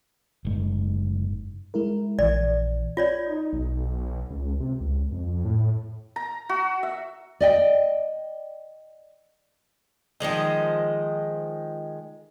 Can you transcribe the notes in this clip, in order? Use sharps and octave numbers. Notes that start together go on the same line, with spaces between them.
F#1 G#2
G#3 E4 A#4
A#1 E3 D5
F4 C#5 D5
D#4
B1
C#2
C3
C#2
F2
A2
A#5
F#4
E5
D5 D#5 G5
D#3 F3 G#3 D#5